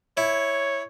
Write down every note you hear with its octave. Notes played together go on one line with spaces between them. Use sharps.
E4 C#5